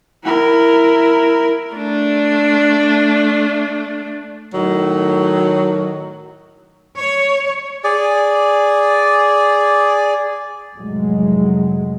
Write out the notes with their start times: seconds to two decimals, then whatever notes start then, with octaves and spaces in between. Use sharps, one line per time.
0.24 E4 A#4
1.75 A3 D4
4.54 A2 D#3 F#3
6.97 C#5
7.84 G#4 D5
10.77 F1 A2 F#3 G#3